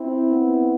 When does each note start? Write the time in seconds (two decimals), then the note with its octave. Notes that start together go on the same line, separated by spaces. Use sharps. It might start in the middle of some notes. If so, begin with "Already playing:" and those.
Already playing: C4 E4
0.32 B3